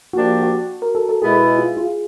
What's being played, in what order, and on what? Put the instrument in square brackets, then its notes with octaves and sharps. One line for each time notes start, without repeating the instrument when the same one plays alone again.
[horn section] F3 A#3 D4 G4 [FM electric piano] F#4
[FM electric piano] F#4
A#4
A4
A4
[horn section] B2 G#3 B3 E4 [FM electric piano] G#4
[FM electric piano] F4
F4